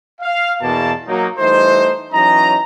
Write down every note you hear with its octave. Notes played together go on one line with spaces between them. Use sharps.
F5
E2 B2 A#3 A5
F#3 A#3 D#4
E3 G3 A3 D#4 F#4 C5
E3 F#3 C#4 D#4 D#5 A#5